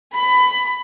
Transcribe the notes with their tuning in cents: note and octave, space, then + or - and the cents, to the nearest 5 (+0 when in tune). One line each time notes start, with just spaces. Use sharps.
B5 +20